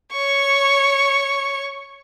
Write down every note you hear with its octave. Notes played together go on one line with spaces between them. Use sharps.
C#5 C#6